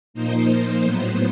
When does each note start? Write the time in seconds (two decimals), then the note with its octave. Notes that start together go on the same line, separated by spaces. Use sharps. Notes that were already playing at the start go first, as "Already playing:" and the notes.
0.14 A#2 F3 A#3 D#4 C5
0.82 A2 F#3 B3